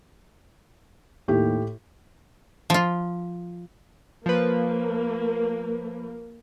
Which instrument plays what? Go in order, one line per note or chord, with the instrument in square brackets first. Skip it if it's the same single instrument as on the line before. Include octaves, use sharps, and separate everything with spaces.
[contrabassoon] D#2 [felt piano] A2 G4
[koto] F3 F4
[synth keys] F3 B4 [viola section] A#3